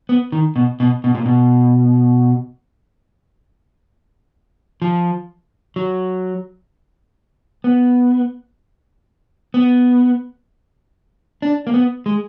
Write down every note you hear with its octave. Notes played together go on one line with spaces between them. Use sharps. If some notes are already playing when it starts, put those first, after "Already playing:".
B3
D#3
B2
B2
B2
A#2
B2
F3
F#3
B3
B3
D4
A#3
B3
G#3